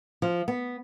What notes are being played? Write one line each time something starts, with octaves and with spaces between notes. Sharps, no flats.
F3
B3